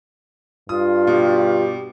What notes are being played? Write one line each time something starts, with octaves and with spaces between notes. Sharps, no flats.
G2 F4 D#6
B2 G4